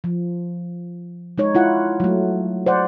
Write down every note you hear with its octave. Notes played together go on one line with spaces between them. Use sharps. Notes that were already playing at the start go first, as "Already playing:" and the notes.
F3
G#3 D#4 C#5
E4 F4 F#5
F#3 A3
C5 D5 F#5